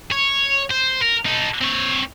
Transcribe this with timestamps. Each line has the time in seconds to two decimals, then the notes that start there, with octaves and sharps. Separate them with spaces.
0.12 C#5
0.71 C5
1.02 A#4
1.26 D#4 A4
1.61 C4 C#5